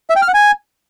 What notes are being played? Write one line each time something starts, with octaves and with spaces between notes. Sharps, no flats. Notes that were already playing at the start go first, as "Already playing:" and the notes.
E5
G5
F6
F#5
G#5